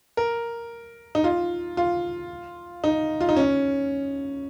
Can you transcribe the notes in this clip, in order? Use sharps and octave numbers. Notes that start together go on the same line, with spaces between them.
A#4
D#4
F4
F4
D#4
F4
D#4
C#4